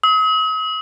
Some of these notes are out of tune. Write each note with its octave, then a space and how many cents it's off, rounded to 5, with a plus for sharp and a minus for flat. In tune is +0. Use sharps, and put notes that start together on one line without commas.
D#6 +45